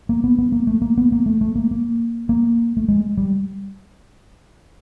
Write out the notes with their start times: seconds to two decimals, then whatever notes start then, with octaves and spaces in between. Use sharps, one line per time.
0.09 A#3
0.24 B3
0.38 B3
0.52 A#3
0.67 A3
0.82 A#3
0.98 B3
1.12 A#3
1.26 A3
1.41 A3
1.55 A#3
1.71 A#3
2.29 A#3
2.77 A3
2.88 G#3
3.17 G3